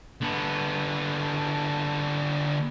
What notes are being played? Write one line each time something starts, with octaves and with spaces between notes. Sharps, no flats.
D3 B3